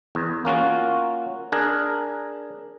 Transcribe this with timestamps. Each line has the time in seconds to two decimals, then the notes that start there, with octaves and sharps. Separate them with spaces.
0.15 E2
0.45 A#3 C#4 F4 F#4
1.52 D4 G#4 A#4